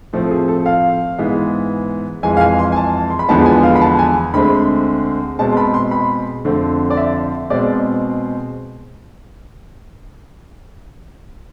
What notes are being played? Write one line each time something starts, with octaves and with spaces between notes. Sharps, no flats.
A2 F3 A3 C4 A4
G#4
A4
F5
G#2 E3 G#3 B3
F2 E3 G#3 G#5
F5
G#5
C6
G#5
A5
C6
B5
E2 D3 F3 G#3 B3 A5
G#5
F5
B5
A5
G#5
D2 D3 G#3 C4 B5
B2 G#3 C4 A5
C6
B5
C6
B5
F2 D3 A3 C4
D5
E5
B2 G#3 C4 D5